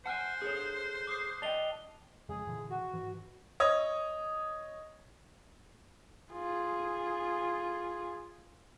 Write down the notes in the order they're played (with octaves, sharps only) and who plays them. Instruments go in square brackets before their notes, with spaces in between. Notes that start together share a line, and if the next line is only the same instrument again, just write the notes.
[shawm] C5 [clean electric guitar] F#5 G#5 [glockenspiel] A5 F6 F#6
[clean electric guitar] G#4 A4 C#5
[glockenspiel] D6 D#6 C7
[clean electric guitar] D5 D#5 G5 [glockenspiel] A5 F7 G7
[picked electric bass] F2 C#3 G#3 [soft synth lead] G#4
[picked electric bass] A#2 D3 E3
[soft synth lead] F#4
[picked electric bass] G#2 E3
[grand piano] C#5 D#5 D#6
[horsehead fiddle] F4 G#4